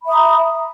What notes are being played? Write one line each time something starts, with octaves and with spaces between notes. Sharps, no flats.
E5 A#5 B5 D#6